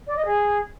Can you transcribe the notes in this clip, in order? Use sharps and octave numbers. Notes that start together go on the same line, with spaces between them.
D5
D#5
G#4